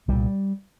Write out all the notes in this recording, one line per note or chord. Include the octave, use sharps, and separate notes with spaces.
C2 A#2 G3